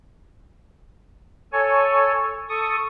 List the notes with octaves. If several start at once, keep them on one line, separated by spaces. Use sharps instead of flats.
A4 C#5 G#5
A4 C#6 D#6